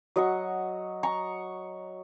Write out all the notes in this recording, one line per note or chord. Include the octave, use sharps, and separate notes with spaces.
F#3 D#5 F#5 C#6
A#5 C#6